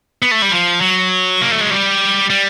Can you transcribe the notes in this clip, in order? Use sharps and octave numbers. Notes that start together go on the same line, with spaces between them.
B3
A3
G3
F3
F#3
A#3
A3
G#3
G3
G3